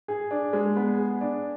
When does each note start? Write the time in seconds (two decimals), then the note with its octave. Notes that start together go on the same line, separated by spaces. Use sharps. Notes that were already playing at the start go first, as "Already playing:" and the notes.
0.08 G#4
0.31 D4
0.53 G#3
0.76 B3
0.98 G#4
1.21 D4